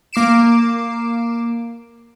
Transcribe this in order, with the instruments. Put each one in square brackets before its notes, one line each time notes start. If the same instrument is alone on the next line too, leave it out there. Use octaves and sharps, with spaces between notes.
[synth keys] A#3 D6 C7 D7 E7